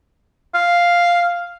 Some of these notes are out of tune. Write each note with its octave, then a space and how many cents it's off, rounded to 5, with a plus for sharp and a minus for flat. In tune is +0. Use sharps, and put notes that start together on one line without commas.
F5 +0